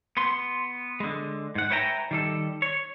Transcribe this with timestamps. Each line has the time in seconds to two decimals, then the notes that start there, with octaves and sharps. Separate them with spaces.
0.17 B3 C6
1.00 D3 G#3
1.55 G#2 F#5
1.70 B4 C#5 E5 G5 G#5 A#5
2.11 D#3 G3 A4
2.62 C#5